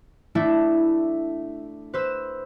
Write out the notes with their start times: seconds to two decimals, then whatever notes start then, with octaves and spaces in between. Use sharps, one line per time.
0.35 A3 D4 E4 A4
1.94 B4 C5 E6